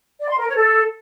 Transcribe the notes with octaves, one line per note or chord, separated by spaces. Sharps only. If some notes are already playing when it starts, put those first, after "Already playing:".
D5
C6
A#4
C#5
A4